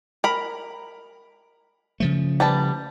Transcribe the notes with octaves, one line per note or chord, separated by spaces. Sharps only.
A#4 B5
C#3 F3 A3
G3 B4 A5